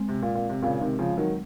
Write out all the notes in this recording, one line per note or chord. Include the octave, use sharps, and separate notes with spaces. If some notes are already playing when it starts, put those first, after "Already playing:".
Already playing: G#3 C4
C3
A#2
A#2
C3
A#2 C#3
C3 D#3
C#3 F3
D#3 F#3